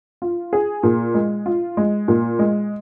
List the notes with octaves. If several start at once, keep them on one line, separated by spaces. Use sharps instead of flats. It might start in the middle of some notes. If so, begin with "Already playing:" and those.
F4
G#4
A#2
G#3
F4
G#3
A#2
G#3